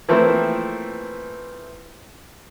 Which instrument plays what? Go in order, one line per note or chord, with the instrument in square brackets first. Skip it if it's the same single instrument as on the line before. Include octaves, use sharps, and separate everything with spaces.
[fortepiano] E3 F3 A3 A#3 C4 E4